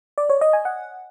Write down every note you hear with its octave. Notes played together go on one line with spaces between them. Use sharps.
D5
C#5
D#5
G#5
F#5